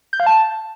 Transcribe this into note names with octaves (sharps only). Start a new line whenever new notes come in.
G6
F5
A5